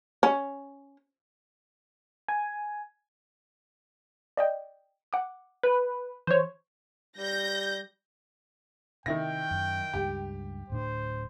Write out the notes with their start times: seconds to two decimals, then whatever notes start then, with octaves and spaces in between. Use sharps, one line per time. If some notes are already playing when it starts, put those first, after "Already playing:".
0.23 C#4
2.28 G#5
4.37 D5 D#5 G5
5.13 F#5 D6
5.63 B4
6.27 E3 C5 C#5
7.18 G3 G6 A#6
9.06 C3 D#3 E4 G5 A#6
9.51 F#2
9.94 C#2 G2 G4
10.70 D1 A2 D4 C5